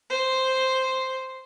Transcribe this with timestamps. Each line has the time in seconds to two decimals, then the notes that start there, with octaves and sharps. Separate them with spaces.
0.10 C5